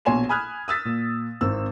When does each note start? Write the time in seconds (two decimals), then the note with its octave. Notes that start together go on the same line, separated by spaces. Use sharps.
0.05 A#1 B2 C#5 G#5 C6 E7
0.29 G#5 B5 D#6 F6 F#6 G#6
0.68 D#6 E6 A6 B6
0.85 A#2
1.41 G#1 C4 E6